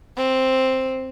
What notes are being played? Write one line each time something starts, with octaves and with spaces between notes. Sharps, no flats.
C4